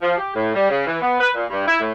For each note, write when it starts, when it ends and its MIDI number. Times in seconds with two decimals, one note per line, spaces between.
0.02 0.14 53
0.17 0.34 67
0.36 0.53 45
0.54 0.68 55
0.69 0.83 49
0.87 1.00 52
1.01 1.20 59
1.20 1.29 71
1.35 1.45 46
1.50 1.66 43
1.67 1.80 64
1.81 1.92 45